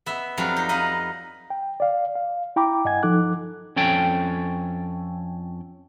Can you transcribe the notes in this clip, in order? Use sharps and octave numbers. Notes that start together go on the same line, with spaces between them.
B3 E5
F2 F#3 G3 D4 F5
D#4
B4 D#5 F5
G5
D5 F5
F5
E4 G5 A#5 B5 D6
G2 D#5 F#5 G#5 G#6
F3 D#4 A4 D6 F#6
F2 C#4 A4 G5